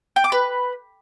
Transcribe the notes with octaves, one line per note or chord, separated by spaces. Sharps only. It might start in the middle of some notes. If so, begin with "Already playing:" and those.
G5
D6
B4